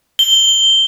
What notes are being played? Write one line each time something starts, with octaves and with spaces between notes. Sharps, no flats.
G7